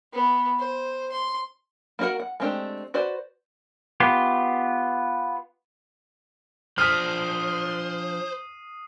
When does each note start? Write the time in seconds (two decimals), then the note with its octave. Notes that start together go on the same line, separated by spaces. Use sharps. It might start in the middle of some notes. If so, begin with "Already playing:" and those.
0.13 B3
0.59 C5
1.12 C6
1.99 A#3 D4 F#4 A#4 F#5
2.20 F#5
2.40 G#3 A3 C4 D4 G4
2.94 F#4 B4 C5 D5
4.00 B3 F4 G4
6.78 F3 D4 C5 D#6 F6 B6 C7 D#7